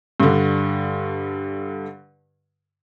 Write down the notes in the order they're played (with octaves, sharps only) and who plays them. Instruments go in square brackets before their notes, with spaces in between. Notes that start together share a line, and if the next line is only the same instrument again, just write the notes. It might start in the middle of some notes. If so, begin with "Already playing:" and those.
[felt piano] G2 D3